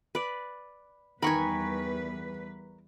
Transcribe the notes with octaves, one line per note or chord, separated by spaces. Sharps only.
B4 D5
E2 D#3 G3 A#4 B4 G#5 B5 C#6